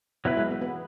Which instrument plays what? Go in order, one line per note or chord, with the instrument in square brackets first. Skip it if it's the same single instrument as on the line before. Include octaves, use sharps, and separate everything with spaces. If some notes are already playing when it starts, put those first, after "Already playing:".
[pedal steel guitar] F#3 E4 B4 [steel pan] B3
[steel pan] G#3
B3
B3